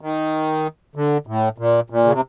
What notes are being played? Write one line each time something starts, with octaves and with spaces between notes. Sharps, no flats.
D#3
D3
A2
A#2
A#2
C#3
C3